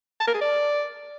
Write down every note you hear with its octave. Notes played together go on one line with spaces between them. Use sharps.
A5
A#4
G#4
D5